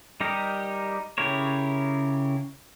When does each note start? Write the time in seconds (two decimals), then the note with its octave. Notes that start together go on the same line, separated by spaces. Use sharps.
0.20 G3 D#4 G4 A#4
1.18 C#3 E4 G4 A#4 C#5